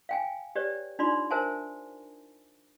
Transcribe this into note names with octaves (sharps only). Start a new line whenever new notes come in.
F5 G5 G#5
G4 B4 C#5 D5
D4 D#4 F4 D5 B5 C6
A#4 C5 E5 G#5 A5